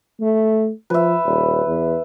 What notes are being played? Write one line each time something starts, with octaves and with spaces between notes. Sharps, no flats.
A3
F3 B4 E5
D#1
E2